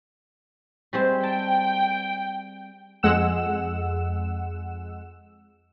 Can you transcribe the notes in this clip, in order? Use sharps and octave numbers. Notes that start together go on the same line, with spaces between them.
G3 G#3 C4
G5 A5
F2 G#3 F#5 E6 E7